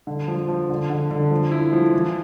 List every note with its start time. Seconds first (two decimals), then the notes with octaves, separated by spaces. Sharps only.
0.07 D3
0.28 F3
0.49 F3
0.69 D3
0.90 D3
1.11 D3
1.31 F3
1.51 E4
1.73 F3
1.94 E3